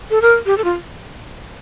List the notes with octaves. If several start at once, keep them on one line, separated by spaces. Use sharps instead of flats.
A4
A#4
G4
A4
F4